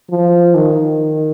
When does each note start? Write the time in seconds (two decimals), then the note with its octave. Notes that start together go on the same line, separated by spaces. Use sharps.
0.11 F3
0.55 D#3